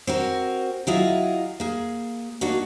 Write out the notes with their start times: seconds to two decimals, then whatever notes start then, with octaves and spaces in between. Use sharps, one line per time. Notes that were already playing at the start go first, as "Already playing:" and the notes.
0.07 C4 F#4 A#4
0.87 F#3 E4 F4 G#4 D#5
1.60 A#3 G#4
2.41 A#3 D4 D#4 F#4